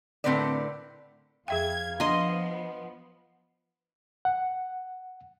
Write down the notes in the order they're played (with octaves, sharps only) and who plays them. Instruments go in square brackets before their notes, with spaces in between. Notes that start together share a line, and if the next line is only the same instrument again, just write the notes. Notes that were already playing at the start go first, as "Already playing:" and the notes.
[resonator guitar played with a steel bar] A2 D3 C4 A#4 B4 D5
[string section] F2 G#6 [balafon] G#4 E5 G5 [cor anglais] F5
[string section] F3 B3 [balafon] D4 A#5 [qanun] D#5 C6
[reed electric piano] F#5